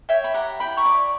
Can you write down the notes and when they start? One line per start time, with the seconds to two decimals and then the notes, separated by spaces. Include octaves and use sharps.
0.09 C#5 E5 G5
0.24 B5
0.34 G4 F#5 A#5
0.60 E4 G5 B5
0.77 A#5 C#6
0.85 D5